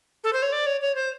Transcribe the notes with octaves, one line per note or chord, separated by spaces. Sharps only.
A4
C5
C#5
D5
C#5
C#5
C5